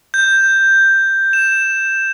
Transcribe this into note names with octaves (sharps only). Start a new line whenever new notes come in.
G6
E7